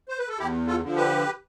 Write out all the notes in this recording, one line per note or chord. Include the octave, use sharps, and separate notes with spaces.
C5
B4
A4
E2 E4 G4
F4 A4
D3 F3
G4 B4